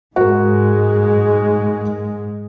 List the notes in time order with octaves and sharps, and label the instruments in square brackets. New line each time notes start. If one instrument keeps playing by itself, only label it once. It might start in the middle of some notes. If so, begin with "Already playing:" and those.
[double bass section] G#2 G#3 [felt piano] F#4 A#4